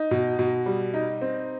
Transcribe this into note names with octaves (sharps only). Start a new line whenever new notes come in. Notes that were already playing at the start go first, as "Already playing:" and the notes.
Already playing: D#4
B2
B2
G3
D#4
C4